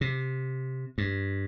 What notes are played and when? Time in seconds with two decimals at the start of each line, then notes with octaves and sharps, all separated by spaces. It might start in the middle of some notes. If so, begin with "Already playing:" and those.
0.01 C3
0.98 G2